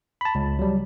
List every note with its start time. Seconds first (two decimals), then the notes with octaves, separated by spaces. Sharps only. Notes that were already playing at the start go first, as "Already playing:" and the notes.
0.21 A5 B5
0.35 C#2
0.59 F#3 G3